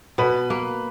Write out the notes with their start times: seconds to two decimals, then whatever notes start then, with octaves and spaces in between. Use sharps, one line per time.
0.18 B2 B4
0.50 A#3